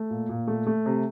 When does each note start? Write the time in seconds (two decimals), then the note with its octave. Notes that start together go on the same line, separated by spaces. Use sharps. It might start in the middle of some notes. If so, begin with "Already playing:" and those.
Already playing: A3
0.10 A#2
0.29 A#2
0.47 A3
0.67 A3
0.86 C3